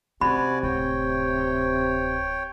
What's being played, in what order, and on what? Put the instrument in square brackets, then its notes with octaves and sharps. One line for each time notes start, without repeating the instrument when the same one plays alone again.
[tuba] C3 [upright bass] C#4 [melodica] F#4 D5 G#5 [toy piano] B5
[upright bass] D1 [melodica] C#5 G5